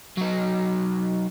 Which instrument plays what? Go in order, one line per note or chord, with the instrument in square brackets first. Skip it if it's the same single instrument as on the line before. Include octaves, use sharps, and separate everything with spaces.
[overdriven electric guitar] F#3 D#4